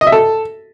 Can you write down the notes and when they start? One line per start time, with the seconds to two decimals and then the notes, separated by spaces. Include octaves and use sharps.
0.01 D#5
0.07 E5
0.12 A4